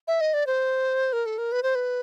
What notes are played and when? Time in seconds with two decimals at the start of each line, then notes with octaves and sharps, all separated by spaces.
0.08 E5
0.21 D#5
0.34 D5
0.47 C5
1.13 A#4
1.26 A4
1.38 A#4
1.52 B4
1.63 C5
1.75 B4